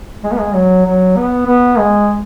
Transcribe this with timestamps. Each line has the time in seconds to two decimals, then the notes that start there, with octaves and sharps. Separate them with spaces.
0.24 G#3
0.32 B3
0.39 G#3
0.54 F#3
0.85 F#3
1.16 B3
1.47 B3
1.78 G#3